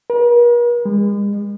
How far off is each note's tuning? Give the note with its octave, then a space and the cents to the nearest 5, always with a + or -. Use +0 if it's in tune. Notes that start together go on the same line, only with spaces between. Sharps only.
A#4 +45
G#3 -40